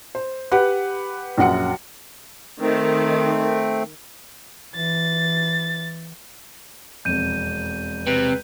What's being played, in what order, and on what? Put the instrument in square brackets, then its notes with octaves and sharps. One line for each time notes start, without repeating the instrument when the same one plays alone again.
[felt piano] C5
G4 B4 F#5 F#6
A#1 F#2 F#5 C#7
[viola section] D#3 [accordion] A3 C4
[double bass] E3 [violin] A6
[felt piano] E1 F2 [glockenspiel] G6 D#7
[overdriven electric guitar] C3 [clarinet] B4